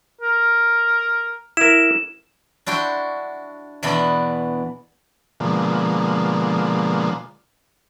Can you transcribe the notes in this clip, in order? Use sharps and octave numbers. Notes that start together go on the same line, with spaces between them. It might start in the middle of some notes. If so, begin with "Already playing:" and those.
A#4
E4 A#4 E7
D4 E4 F#4 G5 C6
E2 B2 E3 B3 D4 E4
B2 D3 F3 G#3 A#3